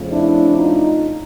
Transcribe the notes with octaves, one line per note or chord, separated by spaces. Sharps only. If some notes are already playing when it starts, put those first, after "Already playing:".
Already playing: F2 C#3 F3 A3
D4 E4
D#4 F4